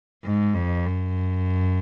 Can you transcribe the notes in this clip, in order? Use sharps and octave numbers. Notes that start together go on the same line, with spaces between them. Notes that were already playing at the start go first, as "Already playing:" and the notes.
G#2
F2
F#2